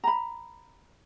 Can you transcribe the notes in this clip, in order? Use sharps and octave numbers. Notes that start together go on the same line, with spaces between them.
A#5 B5